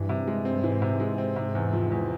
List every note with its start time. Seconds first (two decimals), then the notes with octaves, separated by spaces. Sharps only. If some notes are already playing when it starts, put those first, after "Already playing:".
Already playing: G2 E3
0.09 C3
0.27 G#3
0.45 C4
0.64 G#2 E3
0.82 C3
1.00 G#3
1.18 C4
1.36 C3
1.55 E2
1.73 F3
1.92 E2